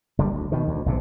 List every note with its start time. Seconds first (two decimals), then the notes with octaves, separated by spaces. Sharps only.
0.18 F#1 D3 G3
0.31 D2
0.52 B2 D#3
0.68 D2
0.86 B1 G#2 C3